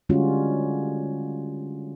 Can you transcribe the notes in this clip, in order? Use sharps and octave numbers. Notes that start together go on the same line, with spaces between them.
D3 G3 G#3 C#4 F4 F#4